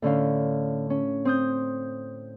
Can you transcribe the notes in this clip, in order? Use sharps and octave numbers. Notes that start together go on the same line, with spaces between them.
A2 D3 C#4 F5
C#4
C4 D#6 G6